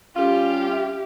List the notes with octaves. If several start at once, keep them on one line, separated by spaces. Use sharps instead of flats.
G3 C#4 F4 G4
E5